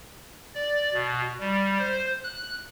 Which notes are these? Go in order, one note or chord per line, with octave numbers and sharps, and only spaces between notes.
D5
B2
G3
C5
F#6